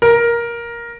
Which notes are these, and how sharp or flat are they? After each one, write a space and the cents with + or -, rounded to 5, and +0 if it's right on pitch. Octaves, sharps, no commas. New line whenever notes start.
A#4 +10